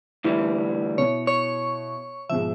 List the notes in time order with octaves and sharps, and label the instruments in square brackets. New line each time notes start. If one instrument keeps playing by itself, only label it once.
[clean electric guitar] D2 E3 G3 [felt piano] E4
[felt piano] B2 E4 [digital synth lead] C#5
[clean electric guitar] C#5 [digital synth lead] C#6
[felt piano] G#2 B2 F3 [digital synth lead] E5